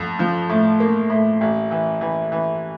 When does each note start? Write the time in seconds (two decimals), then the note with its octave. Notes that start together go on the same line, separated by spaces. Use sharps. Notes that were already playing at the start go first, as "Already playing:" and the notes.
Already playing: F2
0.19 F3
0.49 A2
0.80 A#3
1.10 A2
1.41 A1
1.71 E3
2.01 E3
2.32 E3